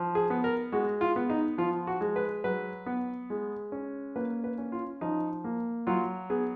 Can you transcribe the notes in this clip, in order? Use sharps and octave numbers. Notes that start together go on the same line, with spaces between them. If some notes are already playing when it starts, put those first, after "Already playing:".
Already playing: F3
G#4
B3
A#4
G#3 F#4
F4
B3
D#4
F3 F4
F#4
G#3
B4
F#3 B4
B3
G#3
C#4
A#3 B4
B4
C#4
F4
F3 D#4
A#3
F#3 F4
B3 G#4